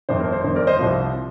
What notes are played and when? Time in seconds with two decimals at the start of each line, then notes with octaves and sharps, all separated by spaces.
0.09 G1 F2 D#3 C5
0.20 A#4
0.32 C5
0.44 G1 F2 D#3 C5
0.55 A#4 D5
0.67 C5 D#5
0.79 C2 C3 F3